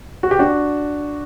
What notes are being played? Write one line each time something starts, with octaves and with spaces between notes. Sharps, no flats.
F#4
G4
D4 F#4